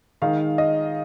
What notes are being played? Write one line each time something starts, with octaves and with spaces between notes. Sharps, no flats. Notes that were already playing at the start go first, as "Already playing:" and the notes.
D#3 G#3 D#4 F5
D#5